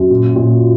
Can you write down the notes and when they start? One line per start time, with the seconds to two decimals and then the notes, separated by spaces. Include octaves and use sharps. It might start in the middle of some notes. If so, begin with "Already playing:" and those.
Already playing: F#2
0.10 A#2
0.36 A#2